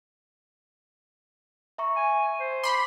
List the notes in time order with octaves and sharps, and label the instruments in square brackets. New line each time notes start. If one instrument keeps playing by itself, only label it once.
[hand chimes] E5 A#5 C#6
[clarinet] G#5
C5
[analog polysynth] B5 C6 [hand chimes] D6